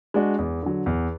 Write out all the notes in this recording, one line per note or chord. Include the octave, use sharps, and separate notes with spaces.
G#3 D4 F#4
E2
D3 F#3
E2